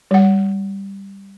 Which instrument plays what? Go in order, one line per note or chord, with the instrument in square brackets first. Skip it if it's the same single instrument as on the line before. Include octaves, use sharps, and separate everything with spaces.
[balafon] G3 F#5